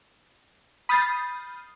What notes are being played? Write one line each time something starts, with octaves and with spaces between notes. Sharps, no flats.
B5 D#6 F6 G6 A6 C7